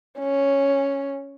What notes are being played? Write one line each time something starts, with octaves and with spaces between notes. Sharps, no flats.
C#4